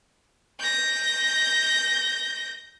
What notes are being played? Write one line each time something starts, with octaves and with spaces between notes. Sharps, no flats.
G6 A#6